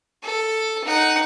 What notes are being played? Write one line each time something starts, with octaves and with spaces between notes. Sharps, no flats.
A4
D#4 F#5